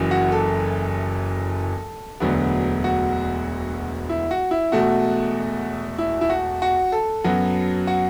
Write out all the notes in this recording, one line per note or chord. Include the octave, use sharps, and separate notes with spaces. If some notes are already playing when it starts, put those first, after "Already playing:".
Already playing: F#1 F#2 E3
F#4
A4
E1 D2 D3 F#3 B3
F#4
E4
F#4
E4
E1 E2 B2 A3 F#4
E4
E4
F#4
F#4
A4
F#2 F#3 B3
F#4